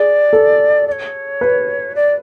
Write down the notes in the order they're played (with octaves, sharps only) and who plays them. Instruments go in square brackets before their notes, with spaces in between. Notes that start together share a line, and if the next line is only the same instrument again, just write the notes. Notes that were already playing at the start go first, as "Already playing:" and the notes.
Already playing: [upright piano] G#4 [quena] D5
[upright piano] A4
[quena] D5
C#5
[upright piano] B4
[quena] D5